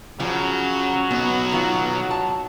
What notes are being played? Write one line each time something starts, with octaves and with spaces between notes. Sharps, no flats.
C#3 F3 F#3
B1 B3 F#4
D#3 F4
A5